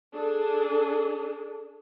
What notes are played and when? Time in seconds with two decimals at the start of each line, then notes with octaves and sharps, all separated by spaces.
0.13 D4 G#4 A4